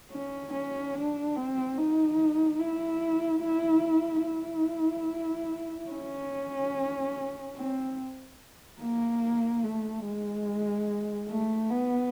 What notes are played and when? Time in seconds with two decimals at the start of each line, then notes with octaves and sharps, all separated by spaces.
0.12 C#4
0.53 C#4
0.95 D4
1.36 C4
1.78 D#4
2.60 E4
3.43 E4
4.26 E4
5.91 C#4
7.56 C4
8.80 A#3
9.64 A3
10.05 G#3
11.29 A3
11.70 B3